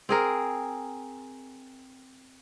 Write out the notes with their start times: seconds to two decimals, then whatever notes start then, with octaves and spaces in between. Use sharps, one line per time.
0.09 C4 G#4 A#4